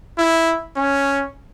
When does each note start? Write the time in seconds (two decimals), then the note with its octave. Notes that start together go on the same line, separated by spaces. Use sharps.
0.18 E4
0.76 C#4